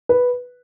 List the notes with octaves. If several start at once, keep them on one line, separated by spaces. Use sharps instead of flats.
B4